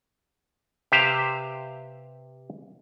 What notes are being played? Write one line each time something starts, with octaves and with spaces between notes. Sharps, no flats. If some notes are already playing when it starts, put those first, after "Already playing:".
C3 G4 B4 C5 F5